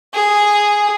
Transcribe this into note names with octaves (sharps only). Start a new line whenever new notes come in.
G#4